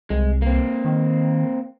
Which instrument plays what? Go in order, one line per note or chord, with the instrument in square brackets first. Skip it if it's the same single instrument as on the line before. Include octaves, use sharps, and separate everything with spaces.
[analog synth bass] C2 [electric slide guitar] G#3
[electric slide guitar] A#3 C4
[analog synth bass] D#3